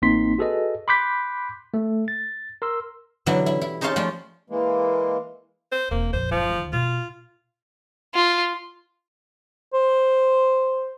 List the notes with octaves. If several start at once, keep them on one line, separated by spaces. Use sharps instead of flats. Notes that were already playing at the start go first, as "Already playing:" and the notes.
A1 A#3 C4 D#4 C6 B6
F#4 G#4 A4 B4 D#5
B5 C6 D6 F#6 G6 B6
A3 A4
A6
A#4 C6 E6
B2 D3 E3 F#3 G3 E4
E4
E4
D#4 G#4 C5 C#5 F5 A5
F3 G3 A3 F4
E3 G#3 A#3
C5
E1 A#3 C4
A#1 F2 C5
F#1 F3 C4
D2 D#3
B2 F4
F4
C5